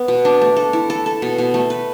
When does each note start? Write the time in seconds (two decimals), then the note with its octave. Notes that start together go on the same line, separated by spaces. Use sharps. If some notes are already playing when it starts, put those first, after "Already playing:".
Already playing: B3
0.08 B2
0.25 D4
0.42 A3
0.57 A4
0.73 E4
0.90 A4
1.06 A4
1.22 B2
1.38 B2
1.54 A3
1.70 B4